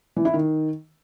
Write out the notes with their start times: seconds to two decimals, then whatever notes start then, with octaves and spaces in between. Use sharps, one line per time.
0.16 E3
0.25 E4
0.34 D#3